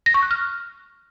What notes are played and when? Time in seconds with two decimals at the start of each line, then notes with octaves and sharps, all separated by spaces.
0.06 A#6
0.14 C#6
0.22 F#6
0.31 F6